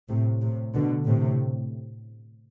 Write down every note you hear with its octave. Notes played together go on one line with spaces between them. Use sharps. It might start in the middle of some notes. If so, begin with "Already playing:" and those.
A2 C3
A2 C3
B2 D3
A2 C3